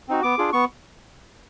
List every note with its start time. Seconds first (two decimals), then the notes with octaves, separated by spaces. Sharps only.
0.08 C4 D#4 F#4
0.23 B3 D6
0.38 D4 F4 G#4
0.53 B3 C#6